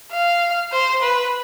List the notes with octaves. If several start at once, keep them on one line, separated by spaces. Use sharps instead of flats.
F5
C5
B4